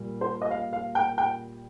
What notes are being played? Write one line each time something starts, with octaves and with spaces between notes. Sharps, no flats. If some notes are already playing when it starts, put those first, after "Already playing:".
Already playing: A#2 G3 A#3
C5
D#5
F5
F5
G5
G5